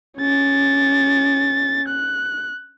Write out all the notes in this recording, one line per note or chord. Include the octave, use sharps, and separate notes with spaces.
C#4 A6
F#6